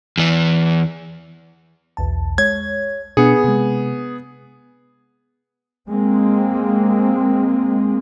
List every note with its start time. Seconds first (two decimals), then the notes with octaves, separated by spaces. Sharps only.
0.18 E2 E3
1.97 B1 E2 A5
2.38 G#3 C#5 G#6
3.17 B2 B3 D4 G#4 C#7
3.44 C3 G#3
5.87 G#3 A#3 C4